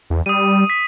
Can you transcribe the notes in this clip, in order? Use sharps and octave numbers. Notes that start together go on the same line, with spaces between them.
E2
G3 D#6 D#7
B6